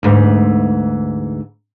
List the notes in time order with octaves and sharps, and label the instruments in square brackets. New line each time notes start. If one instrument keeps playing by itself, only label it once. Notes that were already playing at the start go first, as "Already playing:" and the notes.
[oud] D2 G#2 E3